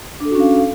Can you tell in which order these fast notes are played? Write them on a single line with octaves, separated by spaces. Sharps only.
D4 A4 F#4 C#4 F5